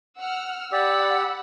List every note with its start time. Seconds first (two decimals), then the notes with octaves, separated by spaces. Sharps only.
0.19 F#5 E6 F6
0.72 G4 D5 F#5 B5 E6